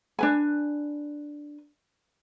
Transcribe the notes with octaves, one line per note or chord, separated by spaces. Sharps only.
D4 B4 G#5